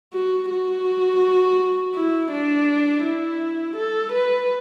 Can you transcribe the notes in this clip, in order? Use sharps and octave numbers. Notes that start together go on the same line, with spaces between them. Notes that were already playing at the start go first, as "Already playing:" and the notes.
F#4
F#4
E4
D4
E4
A4
B4